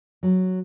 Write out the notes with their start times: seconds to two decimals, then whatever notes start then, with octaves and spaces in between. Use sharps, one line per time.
0.23 F#3